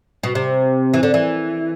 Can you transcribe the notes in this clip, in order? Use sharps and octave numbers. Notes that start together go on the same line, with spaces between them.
B2
C3
E3
D3
E3